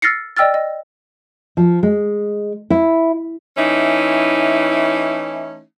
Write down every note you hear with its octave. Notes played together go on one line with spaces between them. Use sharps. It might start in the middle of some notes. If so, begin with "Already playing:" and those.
E6 F6 A6 A#6 C7 C#7
D5 D#5 G5 E6 F6 A6
D#5
F3
G#3
E4
E3 A3 C#4 D#4 E4